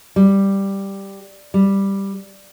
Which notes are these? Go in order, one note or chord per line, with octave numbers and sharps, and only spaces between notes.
G3
G3